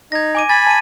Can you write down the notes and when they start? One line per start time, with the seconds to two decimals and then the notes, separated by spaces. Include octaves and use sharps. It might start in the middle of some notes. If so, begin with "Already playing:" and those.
0.12 D#4 G#6 A#6
0.35 G#5 D6 D#7
0.49 G#5 B5 A6
0.67 A5 D#7